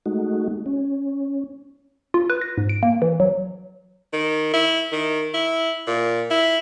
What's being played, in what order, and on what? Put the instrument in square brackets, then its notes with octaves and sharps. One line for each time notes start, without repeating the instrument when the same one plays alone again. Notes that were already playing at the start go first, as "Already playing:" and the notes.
[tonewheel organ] G#3 A3 D#4 F#4
C#4
[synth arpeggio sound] F4
B4
A#6
G#2
D7
A#3
E3
F#3
[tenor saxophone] D#3
E4
D#3
E4
A#2
E4